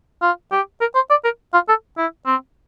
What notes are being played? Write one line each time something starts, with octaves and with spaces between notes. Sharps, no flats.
F4
G4
A#4
C5
D5
A#4
F4
A4
E4
C4